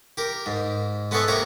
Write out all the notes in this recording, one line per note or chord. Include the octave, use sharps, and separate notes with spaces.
G4 A#4
G#2
G#3 B3 C#4 A4 C#5 E5
C3 A#3 C#5 A#5